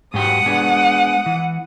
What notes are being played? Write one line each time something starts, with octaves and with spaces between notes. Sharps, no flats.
G#2 F#3 G4 F#5 D#6
G#3 B3 D4
E3